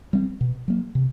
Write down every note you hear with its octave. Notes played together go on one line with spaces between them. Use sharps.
G3 C4
B2
F#3 A#3
C3